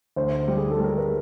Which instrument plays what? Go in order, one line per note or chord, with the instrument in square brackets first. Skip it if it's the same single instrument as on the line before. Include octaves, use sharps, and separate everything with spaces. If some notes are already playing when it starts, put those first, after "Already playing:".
[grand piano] D2 [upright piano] C5
[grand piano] G3
[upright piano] G#4
A4
[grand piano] G3 [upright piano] A#4
[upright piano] B4